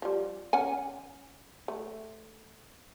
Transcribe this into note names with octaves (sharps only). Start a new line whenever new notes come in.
F3 G3
C#4 F#5 G#5
A3